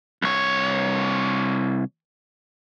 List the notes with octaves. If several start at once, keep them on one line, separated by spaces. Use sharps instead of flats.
C2 C#5